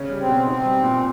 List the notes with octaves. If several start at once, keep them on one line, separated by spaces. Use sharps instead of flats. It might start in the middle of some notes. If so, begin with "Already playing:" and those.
Already playing: C#3 C#4
G3
C4
B2
C4 D#4
G3
A#2